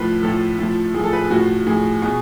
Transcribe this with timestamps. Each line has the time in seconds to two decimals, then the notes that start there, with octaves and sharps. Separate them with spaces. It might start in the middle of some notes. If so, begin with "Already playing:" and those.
Already playing: A2 F3 B4
0.23 A2 F3 A4
0.59 A2 F3
0.94 A2 F3 G#4
1.04 A4
1.13 B4
1.22 G#4
1.30 A2 F3 F#4
1.67 A2 F3 G#4
2.02 B2 G#4